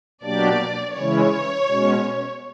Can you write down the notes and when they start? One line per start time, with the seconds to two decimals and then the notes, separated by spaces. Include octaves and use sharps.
0.23 B2 F#3 A#3 D4 G4 D5
0.96 C#3 E3 G#3 C#4 E4 C#5
1.69 B2 G#3 C#4